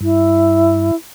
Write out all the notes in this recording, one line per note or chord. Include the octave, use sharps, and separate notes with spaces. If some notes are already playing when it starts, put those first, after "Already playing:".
G2 E4